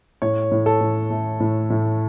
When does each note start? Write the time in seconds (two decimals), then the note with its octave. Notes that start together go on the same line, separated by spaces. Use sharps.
0.22 A2 C#5
0.52 A2
0.66 A4
0.81 A2
1.10 A3
1.40 A2
1.70 A2